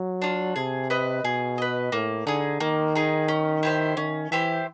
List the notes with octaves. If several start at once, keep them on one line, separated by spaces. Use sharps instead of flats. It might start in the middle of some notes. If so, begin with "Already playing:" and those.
Already playing: F#3
D4 F4
C3 G#4
B4 D#5
B2 G#4
B4 D#5
A2 A#3
D3 D#4 G#4
D#3 A#3
D#4 G#4
C#4
E4 G4 C5
D#3 C#4
E3 E4 G4 C5